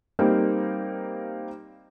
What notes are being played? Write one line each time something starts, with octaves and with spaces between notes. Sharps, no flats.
G3 A#3 C4 D#4